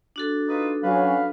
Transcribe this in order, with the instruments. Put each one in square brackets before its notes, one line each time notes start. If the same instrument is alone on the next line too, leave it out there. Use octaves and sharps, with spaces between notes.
[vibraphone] D4 F#4 A4
[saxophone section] D#4 F4 B4
[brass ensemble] F#3 C#4 [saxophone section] B4 F5